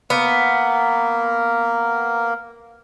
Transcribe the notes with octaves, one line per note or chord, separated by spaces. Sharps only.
A#3 B3 A#4